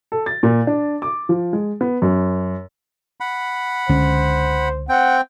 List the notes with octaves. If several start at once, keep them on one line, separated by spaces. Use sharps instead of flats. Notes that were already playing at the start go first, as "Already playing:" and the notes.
A4
A6
A#2
D4
D6
F3
G#3
B3
F#2
F#5 B5
C#2 D3 C#4 C5
C4 F#5 G5